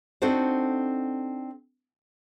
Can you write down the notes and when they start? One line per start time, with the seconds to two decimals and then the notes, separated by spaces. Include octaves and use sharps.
0.22 C4 D4 D#4 F#4 A4 C5